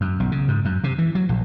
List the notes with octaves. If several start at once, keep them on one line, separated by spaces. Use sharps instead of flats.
F#2
B1
C#3
G#2
F#2
C3
E3
F#3
A#1